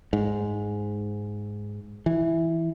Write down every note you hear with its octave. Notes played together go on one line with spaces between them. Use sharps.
G#2
E3